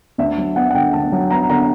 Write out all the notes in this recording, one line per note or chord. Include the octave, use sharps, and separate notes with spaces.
D2 E5
F#3
B3 F#5
F#5
D3 G5
D2 A5
F#3
B3 A#5
D3 A#5